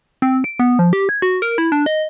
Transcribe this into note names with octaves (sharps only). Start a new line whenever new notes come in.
C4
D7
B3
F3
G4
G#6
F#4
A#4
E4
D4
D#5